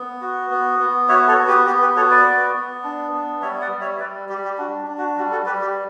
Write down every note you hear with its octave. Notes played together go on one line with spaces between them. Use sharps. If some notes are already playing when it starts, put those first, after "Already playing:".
Already playing: B3
F#4
B3
B3
F#4 C#5 E5
A4 C#5
B3
G4 B4
B3 G4
G4 B4
F#4 A4 C#5
B4 D5
B3
B3
D4
B3
G3 C#5 E5
D5 F#5
G3
C#5 E5
E5
G3 B4 D5
G3 G4
G4
D4 F#4
D4
F#4
G3 F#4
F#4 A4
G3 G4 B4
G4